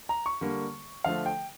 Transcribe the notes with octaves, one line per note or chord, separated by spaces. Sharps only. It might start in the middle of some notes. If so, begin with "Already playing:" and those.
A#5
C#6
D3 G3 A#3
D3 F3 A3 F5
G5